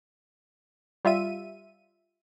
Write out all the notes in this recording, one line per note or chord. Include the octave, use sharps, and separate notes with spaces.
G3 F4 E5 D#7